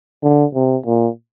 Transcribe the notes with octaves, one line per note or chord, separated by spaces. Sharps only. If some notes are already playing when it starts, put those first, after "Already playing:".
D3
C3
A#2